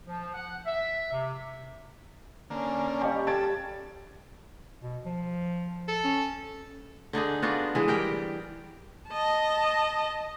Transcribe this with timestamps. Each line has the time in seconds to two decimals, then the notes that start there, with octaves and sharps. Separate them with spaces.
0.07 F3
0.35 F#5
0.66 E5
1.12 C3
2.50 D3 A#3 C#4
3.01 G3 G4 D#5 F5 A5 C#6
3.27 A4 G#6 A6 D7
4.81 B2
5.06 F3
5.88 A4
6.05 C#4
7.13 D3 D4 D#4 G#4
7.42 B3 D4 F4 F#4
7.75 E3 G#3 G#4
7.88 G3 G4 A#4 G5
9.09 D#5 A5